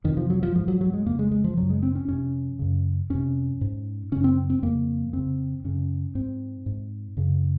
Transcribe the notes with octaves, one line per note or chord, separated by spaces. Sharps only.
F2 C3 D#3
F3
F#3
F3
G#2 F3
F#3
F#3
G#3
F2 C#3 A#3
G#3
G#3
F3
F#2 C#3 F#3
G#3
C4
C#4
F2 C3 C#4
F#2 C#3
F2 C3 C#4
G#2
F#2 C#3 C#4
C4
C4
F2 C#3 A#3
F2 C#3 C4
F#2 C#3 C#4
G#2 C4
G#2
F#2 C#3